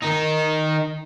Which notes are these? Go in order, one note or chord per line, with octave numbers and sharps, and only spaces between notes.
D#3 D#4